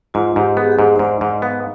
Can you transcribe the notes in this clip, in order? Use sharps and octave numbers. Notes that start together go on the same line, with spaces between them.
G#2 F4
G#2 G4
B3 G#4
G4
G#4
G#2
C5
G#2 D5
G#2
B3 F5